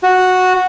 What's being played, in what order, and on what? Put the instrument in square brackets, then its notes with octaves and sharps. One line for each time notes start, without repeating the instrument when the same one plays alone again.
[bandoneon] F#4